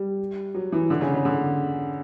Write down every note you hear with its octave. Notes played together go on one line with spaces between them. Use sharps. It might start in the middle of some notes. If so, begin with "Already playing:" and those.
Already playing: G3
F#3
E3
D3
C#3
C#3
D3